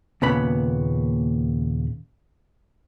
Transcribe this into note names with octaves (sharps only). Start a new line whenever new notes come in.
D#2 A#2 C#3 B3 B5